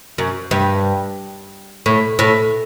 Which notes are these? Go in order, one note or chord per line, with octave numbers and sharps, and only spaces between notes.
F#2
G2
A2
A2